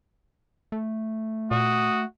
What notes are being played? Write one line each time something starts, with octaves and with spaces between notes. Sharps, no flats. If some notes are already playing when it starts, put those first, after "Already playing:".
A3
A#2 F#4 D#6